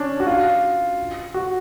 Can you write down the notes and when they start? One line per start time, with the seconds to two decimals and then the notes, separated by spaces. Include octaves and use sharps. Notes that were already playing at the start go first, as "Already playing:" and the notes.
Already playing: C#4 D4
0.20 F#4
0.27 F4
1.34 F#4